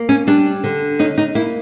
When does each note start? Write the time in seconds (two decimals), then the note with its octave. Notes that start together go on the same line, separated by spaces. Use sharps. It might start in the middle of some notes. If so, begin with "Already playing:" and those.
Already playing: A#3
0.09 C#4
0.27 G3 D4
0.64 D3
0.99 C#4 D#4
1.18 D#4
1.35 A#3 E4